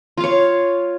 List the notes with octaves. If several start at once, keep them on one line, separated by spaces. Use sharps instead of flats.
F4 C#5 F5